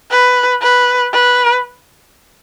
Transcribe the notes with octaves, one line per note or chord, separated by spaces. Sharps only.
B4
B4
B4